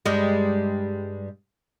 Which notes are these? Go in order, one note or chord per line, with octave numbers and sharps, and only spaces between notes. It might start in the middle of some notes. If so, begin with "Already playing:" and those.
G2 G3 G#3